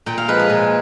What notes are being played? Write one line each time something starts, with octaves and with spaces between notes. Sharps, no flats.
A#2 G5
F5
F3 G#3 B4
G#4
A#2